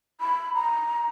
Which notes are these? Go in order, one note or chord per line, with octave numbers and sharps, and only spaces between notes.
B5
A#5